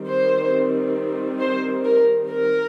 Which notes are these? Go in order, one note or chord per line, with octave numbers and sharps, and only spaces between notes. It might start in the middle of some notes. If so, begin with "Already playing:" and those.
Already playing: D#3 G3 C4
C5
C5
A#4
A#4